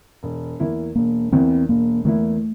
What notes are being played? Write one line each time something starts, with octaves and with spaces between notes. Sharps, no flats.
E1
E2 E3 A#3 E4
E1 A#3
E2 E3 A#3 C4 E4
E1 A#3
E2 E3 A3 A#3 E4